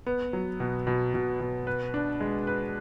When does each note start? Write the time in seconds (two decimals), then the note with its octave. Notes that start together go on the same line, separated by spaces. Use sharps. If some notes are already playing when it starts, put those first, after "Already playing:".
0.06 B3
0.33 F#3
0.60 B2
0.87 B2
1.14 B2
1.40 B2
1.67 B4
1.94 D4
2.20 G#3
2.47 B4